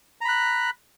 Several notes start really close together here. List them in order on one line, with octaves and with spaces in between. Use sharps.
A#5 B5 F#6